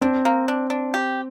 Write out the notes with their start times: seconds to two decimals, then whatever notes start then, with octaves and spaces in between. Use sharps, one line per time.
0.01 C4 D4
0.25 A#3
0.48 D4
0.70 D4
0.94 G4